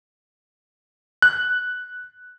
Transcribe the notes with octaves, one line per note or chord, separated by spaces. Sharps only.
F#6